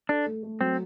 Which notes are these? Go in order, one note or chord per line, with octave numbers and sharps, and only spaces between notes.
D4 A4
A3
A3
F#3 C4